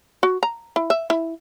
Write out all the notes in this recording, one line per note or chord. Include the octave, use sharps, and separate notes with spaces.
F#4
A#5
E4
E5
E4